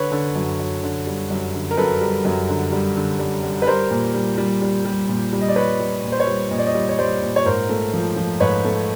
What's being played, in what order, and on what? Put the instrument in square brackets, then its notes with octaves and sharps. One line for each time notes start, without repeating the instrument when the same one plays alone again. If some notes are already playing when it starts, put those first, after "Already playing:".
Already playing: [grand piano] D3 B4 C#5
D3
F#2
F#2
D3
G3
F#2
D3
A#4
F#2 A4 B4
G3
F#2
D3
G3
D3
G3
G3
B4
G3 A#4 C5
A#2
G3
G3
G3
G3
A#2
G3
D#5
D5
G3 B4 C#5
G3
A#2
C5
B4 C#5
G3
A#2 D#5
D5
C#5 D#5
G3
C#5
G3 C5 D5
A#2
C#5
G#2 A#4 C5
A3
F3
F3
G#2 B4 C#5
A3